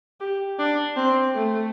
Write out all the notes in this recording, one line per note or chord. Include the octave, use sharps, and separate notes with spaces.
G4
D4
C4
A3